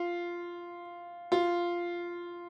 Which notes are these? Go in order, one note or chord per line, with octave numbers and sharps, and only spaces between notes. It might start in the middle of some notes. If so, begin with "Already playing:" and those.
Already playing: F4
F4